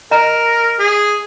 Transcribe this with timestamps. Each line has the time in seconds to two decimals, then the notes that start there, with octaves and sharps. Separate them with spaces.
0.11 A#4 D#5 A#5
0.79 G#4